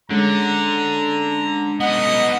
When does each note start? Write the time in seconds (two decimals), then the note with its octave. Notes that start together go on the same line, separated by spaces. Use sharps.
0.10 D3 G#3 C#4 A4 A#5
1.80 B3 D#4 D#5 F#5